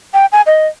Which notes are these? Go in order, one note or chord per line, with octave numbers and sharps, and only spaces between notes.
G5
G#5
D#5